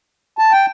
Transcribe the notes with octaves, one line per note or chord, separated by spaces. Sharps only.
A5
G5